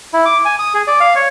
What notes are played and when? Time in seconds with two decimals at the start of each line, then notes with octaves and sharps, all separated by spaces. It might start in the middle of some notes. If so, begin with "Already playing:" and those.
0.13 E4
0.26 D6
0.45 G#5
0.59 D#6
0.74 G#4
0.87 D5
1.00 F5
1.16 C#5